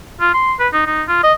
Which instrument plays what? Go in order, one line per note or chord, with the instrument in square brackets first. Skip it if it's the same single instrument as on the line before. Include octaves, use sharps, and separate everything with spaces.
[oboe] F4
C6
B4
D#4
D#4
F4
D#5